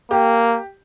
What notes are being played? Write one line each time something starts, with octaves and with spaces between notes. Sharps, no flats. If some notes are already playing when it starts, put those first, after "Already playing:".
A#3 G4